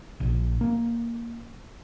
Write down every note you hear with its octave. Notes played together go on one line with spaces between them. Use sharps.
A#1
A#3